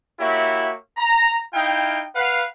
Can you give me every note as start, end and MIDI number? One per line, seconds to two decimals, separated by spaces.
0.20 0.72 58
0.20 0.72 64
0.20 0.72 66
0.20 0.72 67
0.20 0.72 73
0.20 0.72 76
0.97 1.37 82
1.54 2.04 63
1.54 2.04 64
1.54 2.04 77
1.54 2.04 79
2.15 2.44 71
2.15 2.44 77
2.15 2.44 78